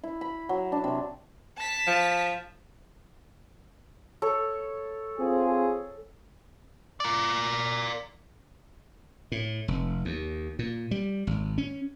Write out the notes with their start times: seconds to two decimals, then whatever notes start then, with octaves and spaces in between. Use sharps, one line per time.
0.03 E4
0.21 B5
0.49 F#3
0.72 D4
0.84 C3
1.58 A5 B6
1.87 F3
4.22 A4 C#5
5.18 C4 F4 G#4
7.00 A#4 D5
9.32 A2
9.68 F1
10.05 D#2
10.59 A#2
10.91 G3
11.27 G#1
11.58 C#4